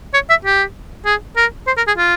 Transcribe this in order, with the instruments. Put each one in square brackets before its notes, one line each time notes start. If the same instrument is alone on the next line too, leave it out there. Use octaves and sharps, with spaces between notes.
[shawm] C#5
E5
G4
G#4
A#4
C5
A#4
G#4
F4